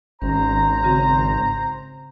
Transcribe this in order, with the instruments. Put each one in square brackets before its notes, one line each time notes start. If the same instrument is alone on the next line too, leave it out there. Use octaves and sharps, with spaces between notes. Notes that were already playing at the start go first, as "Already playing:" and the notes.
[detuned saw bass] G#1 [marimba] C#4 [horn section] C5 A#5
[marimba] C#3 C4 F#4